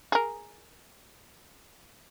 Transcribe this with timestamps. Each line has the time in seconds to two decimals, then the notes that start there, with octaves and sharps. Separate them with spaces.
0.12 G#4 A#4